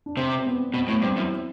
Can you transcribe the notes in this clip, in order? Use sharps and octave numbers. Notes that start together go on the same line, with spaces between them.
D4
C3 C4
C4
B3
B2 C4
A2 B3
G2 C4
F#2 E4